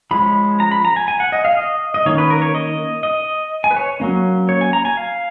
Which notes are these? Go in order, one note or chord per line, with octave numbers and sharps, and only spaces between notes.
F3 G#3 C#4 B5
A#5
B5
A#5
G#5
G#5
F#5
D#5
F5
D#5
D#5
D#3 A#3 C#4 C#5
B4
A#4
C#5
D#5
D#5
G#5
B4
C#5
F#3 A#3 C#4
C#5
G#5
A#5
G#5
F5